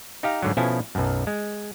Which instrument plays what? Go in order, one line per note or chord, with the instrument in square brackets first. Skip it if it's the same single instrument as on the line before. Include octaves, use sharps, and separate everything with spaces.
[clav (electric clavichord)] D#4 G4 F5 A#5
G#2 D3 F#3
B2 F3 C#4 E4 A4 G#5
B1 F#2
G#3